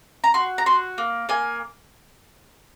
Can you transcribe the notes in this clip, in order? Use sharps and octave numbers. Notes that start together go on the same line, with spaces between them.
A#5
F#4 C6
A#5
F#4 C6
A#3
A#3 G#5